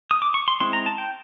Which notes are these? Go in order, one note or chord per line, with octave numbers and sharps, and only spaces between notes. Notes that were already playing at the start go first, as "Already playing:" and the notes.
D#6
D6
C#6
C6
G#3 C4 E4 C6
A#5
A5
G5